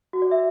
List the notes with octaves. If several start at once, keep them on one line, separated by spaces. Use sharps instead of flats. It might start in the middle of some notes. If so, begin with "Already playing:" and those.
F#4
D5
E5